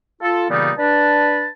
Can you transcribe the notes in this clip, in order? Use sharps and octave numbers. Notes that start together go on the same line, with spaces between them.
F4 A4
A#2 C#3 E3 G3 B3 D#4
D4 B4 A5